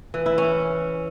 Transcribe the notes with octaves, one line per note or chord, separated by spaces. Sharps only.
E3
E4
C#4